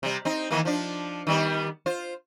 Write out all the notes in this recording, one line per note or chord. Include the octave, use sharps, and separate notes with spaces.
C3 G3
C4 D#4
D#3 E3 A#3
F3 D4
D#3 G3 B3
F4 C5